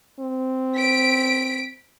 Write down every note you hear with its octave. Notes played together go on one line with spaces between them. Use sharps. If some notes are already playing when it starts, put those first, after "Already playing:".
C4
B6 D7